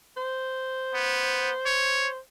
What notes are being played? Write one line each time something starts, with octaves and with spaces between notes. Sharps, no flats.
C5
B3
C#5